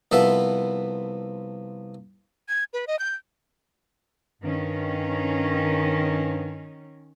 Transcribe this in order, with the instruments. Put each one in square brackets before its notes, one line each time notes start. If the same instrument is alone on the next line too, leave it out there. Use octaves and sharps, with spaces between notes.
[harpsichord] C2 F3 B3 A4 E5 F#5
[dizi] G#6
B4
D#5
G6
[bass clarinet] G2 [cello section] D#3 C#4